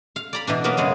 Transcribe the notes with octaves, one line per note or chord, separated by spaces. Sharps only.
F5
D5 A#5 B5
B2 E3 D4
F#3 A#3 B3 A#4 B4
F#2 C#3 G#3 G#4